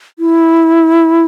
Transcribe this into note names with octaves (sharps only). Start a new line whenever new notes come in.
E4